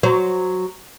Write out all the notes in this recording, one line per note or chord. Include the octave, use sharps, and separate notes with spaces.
F#3 C5